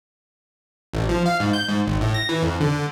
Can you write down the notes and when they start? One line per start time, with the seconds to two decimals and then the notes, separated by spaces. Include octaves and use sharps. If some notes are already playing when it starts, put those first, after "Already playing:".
0.93 A1
1.09 F3
1.26 F5
1.40 G#2
1.53 G6
1.68 G#2
1.88 G#1
2.01 A2
2.14 A#6
2.29 E3
2.43 F2
2.60 D3